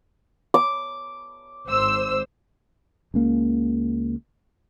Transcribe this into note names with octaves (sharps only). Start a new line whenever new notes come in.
D6
G#1 C5 E6
C#2 C#3 A#3